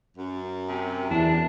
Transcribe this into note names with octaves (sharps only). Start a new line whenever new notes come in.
F#2
C3
E2 D4 E4